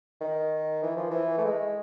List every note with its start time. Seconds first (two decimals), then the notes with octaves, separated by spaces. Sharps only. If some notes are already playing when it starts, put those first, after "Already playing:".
0.21 D#3
0.82 E3
0.96 F3
1.10 E3
1.38 A3
1.45 G#3